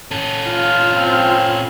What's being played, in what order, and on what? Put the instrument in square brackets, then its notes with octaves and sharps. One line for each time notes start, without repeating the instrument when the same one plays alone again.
[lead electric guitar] C#4 A4
[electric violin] F4 F6
[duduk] C4